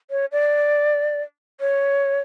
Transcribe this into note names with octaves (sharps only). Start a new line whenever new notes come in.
C#5
D5
C#5